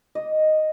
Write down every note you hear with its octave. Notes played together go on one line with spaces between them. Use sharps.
D#5